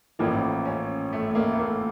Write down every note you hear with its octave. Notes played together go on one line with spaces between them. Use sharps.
A1 A2 F3 A#3
C#4
A3
A3
A#3
A3
A#3